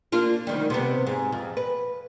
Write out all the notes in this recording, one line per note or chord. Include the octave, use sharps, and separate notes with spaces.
A#3 D4 F4
D2 D#3 G3
C3 B3
G#2
F2
B4